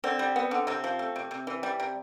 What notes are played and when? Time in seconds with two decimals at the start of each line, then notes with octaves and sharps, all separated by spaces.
0.04 D3 C4
0.19 G3
0.36 B3
0.51 D3
0.67 C3 C4
0.84 F3
0.99 A3
1.16 C3
1.31 C3
1.47 E3
1.63 G3
1.80 C3